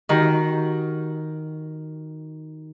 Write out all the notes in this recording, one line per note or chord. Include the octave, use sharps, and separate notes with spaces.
D#3 F#4 G4 A#5